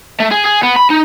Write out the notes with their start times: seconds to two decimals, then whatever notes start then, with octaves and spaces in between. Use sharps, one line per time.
0.20 A3
0.31 G#4
0.45 G#4
0.63 B3
0.76 B5
0.90 D#4